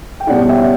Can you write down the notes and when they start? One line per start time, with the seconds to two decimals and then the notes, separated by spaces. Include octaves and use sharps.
0.20 G5
0.27 B2 G3 C#4 E4 D5 F#5
0.49 E5 G5